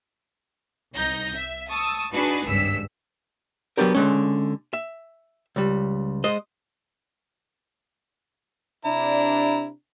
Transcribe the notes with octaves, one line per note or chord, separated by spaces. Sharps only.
C2 D#4 G6 A#6
E5
A5 C#6 D#6 E6
D4 D#4 F#4 G#4 B4 A5
G#1 C#2 G2 E6 B6
F#3 A3 B3 D4 G4 A#4
D3 G#3 C#4
E5
C#2 G3
G#3 C5 D#5
C3 D4 E4 A#5